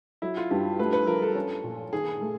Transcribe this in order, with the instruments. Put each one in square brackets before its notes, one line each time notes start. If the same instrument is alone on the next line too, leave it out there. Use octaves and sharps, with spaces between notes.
[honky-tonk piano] F#3 [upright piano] E4
[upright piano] F4
[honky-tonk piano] G2 [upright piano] G4
[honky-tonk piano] A3 [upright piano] B4
[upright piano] B4
[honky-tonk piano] F3 [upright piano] A#4
[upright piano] A4
[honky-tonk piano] C#4
A#2
[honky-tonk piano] D#3 [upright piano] G#4
[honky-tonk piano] A3